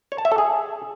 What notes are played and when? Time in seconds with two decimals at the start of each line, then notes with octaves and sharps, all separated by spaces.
0.12 C#5
0.18 A5
0.25 E5
0.32 A4
0.38 G#4